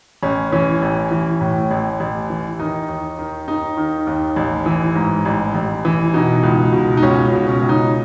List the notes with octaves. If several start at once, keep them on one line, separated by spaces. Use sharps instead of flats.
A1 C#4
E3 C#4
A1
E3
A2
A1
A1
E3
D#3 D#4
D#2
D#3
D#2 D#4
D#3
D#2
A1
E3
G#2
A1
A1
E3
B2 D#4
C#2
B2
D#4
C#2 C#4
B2
C#4
C#2
D#4